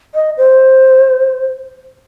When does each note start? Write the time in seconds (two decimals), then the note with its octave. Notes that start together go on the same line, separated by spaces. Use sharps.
0.15 D#5
0.37 C5